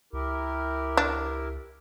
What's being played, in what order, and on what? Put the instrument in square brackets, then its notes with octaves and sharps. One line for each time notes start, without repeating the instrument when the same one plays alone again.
[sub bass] C#2 [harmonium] E4 G4 A#4
[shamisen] D4